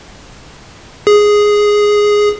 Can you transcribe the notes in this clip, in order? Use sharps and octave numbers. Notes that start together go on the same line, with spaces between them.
G#4